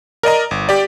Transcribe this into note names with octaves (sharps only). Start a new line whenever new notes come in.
A#4 D5 D#5 A#5
G1
G4 D5